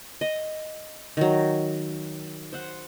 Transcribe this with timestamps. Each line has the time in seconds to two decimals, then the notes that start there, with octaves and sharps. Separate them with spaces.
0.21 D#5
1.17 D#3 F#3
2.53 C5 F#5